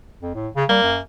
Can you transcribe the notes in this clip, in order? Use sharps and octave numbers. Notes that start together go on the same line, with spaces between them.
F2
A2
C#3
G3 A#3
F#2